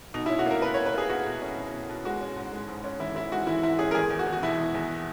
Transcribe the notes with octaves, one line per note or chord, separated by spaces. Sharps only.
B2 D#4
C#4 E4
F#4
A#3 A#4
B2 B4
B2 C#5
B4
A#3 G#4
B2 F#4
B2
C#4
B2
B2
B2
G#3 F#4
C#4
G#2
G#3
G#2
C#4
E3 E4
E3 E4
G#3 F#4
E3 E4
G#2 E4
C#4 G#4
A#4
E2 G#4
E2
F#4
E2
F#4
B2 E4
E2
E2